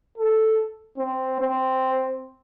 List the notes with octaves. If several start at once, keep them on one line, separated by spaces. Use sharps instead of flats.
A4
C4
C4